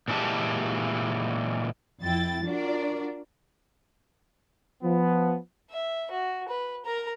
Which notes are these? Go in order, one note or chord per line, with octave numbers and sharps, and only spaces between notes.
A#2 E3 G#3 G4 A5
F2 E4 G5 A6
D4 F4 F#4 A#4 D5
F3 B3
E5
F#4
B4
A#4 A#5